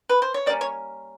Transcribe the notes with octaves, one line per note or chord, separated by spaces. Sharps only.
B4
C5
C#5
G3 A#3 C#4 D5
C#5